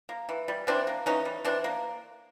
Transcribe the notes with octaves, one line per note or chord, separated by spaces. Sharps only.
A#3
E3
G3
E3 C4 D4
A#3
E3 C#4 D#4
G3
E3 C4 D4
A#3